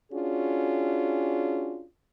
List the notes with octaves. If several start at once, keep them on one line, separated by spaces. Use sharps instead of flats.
C#4 D4 F4 F#4 G#4